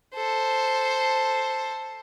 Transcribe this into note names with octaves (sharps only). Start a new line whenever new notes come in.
A4 C5